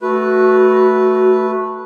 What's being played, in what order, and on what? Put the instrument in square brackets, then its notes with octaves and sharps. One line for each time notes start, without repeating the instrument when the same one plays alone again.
[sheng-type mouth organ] A3 B4 [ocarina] F#4